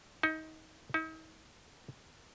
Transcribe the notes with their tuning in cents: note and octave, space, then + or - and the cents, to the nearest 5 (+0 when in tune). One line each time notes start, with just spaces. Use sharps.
D#4 +25
D#4 +45